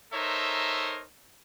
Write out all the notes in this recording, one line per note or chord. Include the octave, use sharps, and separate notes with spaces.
D#4 A4 A#4 C5 C#5 E5